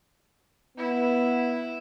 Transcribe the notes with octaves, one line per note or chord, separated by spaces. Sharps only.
B3 E4